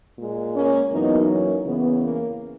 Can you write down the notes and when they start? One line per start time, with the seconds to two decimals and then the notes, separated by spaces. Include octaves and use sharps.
0.18 A#2 G#3
0.55 A#3 C#4
0.91 F#2 E3 A#3 B3 D#4
1.28 A#3 C#4
1.65 E2 C#3 E3 A#3 B3
2.02 A#3